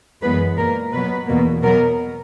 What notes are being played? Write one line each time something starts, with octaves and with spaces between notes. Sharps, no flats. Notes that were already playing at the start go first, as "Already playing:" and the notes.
F#2 E3 G#3 B3 B4
A#2 A#3 A#4
B2 F#3 B3 B4
E2 B2 A#3
B2 F#3 B3 A#4